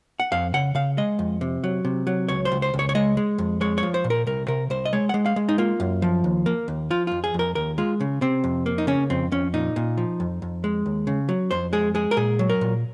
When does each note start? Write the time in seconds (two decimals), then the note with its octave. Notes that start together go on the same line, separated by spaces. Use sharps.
0.20 F#5
0.32 F2 F5
0.54 C#3 F#5
0.75 C#3 F5
0.98 G#3 D#5
1.19 F2
1.41 C3
1.64 F#3
1.85 C3
2.07 F#3
2.29 C#2 C#5
2.45 C5
2.52 C#2
2.62 C5
2.74 C#2
2.79 C#5
2.89 C#5
2.95 G#3 D#5
3.17 G#3
3.38 F2
3.61 G#3 C#5
3.78 C#5
3.83 F3
3.94 C5
4.04 A#2
4.10 A#4
4.27 C2 A#4
4.48 C3 A#4
4.70 C2 C5
4.85 D#5
4.93 G#3 C#5
5.09 G#3 F#5
5.26 F5
5.36 G#3
5.49 D#4
5.58 A#3 F4
5.80 F#2
6.02 F3
6.24 D#2
6.46 A#3
6.68 D#2
6.90 F3 F4
7.07 F2 F4
7.24 G#4
7.34 F2
7.39 A#4
7.55 D#2 A#4
7.78 G#3 F4
8.01 C#3
8.21 C3 C4
8.44 F2
8.66 A#3
8.78 D#4
8.87 C#3 C#4
9.10 F2 C4
9.32 F2 C#4
9.54 A#2 D#4
9.76 A#2
9.98 F3
10.20 F2
10.42 F2
10.64 G#3
10.86 D#2
11.07 C#3
11.29 F#3
11.51 F2 C5
11.73 G#3 G#4
11.95 G#3 G#4
12.11 A#4
12.17 A#2 G#4
12.39 F#3
12.50 A#4
12.61 A#2